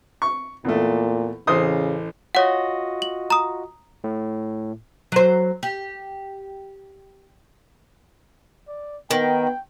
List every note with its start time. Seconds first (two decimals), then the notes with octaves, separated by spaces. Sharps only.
0.22 C#6
0.65 E2 A#2 A3
1.47 A1 C#3 C5 D#6
2.35 F4 F#4 C#5 D#5 F#5
3.02 F#7
3.30 A#5 D#6
4.04 A2
5.12 F#3 C5
5.63 G4
8.68 D5
9.11 D#3 B3 G5